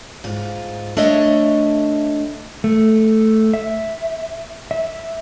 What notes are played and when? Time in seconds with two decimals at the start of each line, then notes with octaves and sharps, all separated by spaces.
0.24 G#2 F4
0.97 A3 D4 C#5 D#5 E5
2.64 A3
3.54 E5
4.71 E5